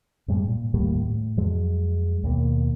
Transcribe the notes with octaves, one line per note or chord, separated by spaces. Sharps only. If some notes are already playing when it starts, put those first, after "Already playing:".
F#2 A2 G3 G#3
A#2
D#2 A2 G3 A#3
A2
F2 F#3 G#3
D#2 B2 A#3